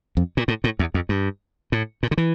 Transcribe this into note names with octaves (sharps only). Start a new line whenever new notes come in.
F2
A#2
A2
A2
E2
F2
G2
A2
A#2
D3
E3